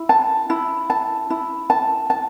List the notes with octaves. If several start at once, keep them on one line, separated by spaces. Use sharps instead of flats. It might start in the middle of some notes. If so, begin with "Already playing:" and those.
Already playing: E4
A5
E4
A5
E4
A5
A5